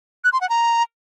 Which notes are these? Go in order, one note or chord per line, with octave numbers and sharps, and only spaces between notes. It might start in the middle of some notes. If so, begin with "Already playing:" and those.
F#6
C6
F#5
A#5